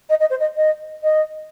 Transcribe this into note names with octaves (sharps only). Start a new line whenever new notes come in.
D#5
D#5
C5
D#5
D#5
D#5